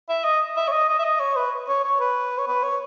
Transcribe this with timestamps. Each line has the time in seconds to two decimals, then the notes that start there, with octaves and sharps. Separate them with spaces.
0.09 E5
0.25 D#5
0.57 E5
0.68 C#5
0.72 D#5
0.89 D#5
0.98 E5
1.04 D#5
1.20 C#5
1.36 B4
1.68 C#5
1.83 C#5
2.00 B4
2.38 C#5
2.47 B4
2.63 C#5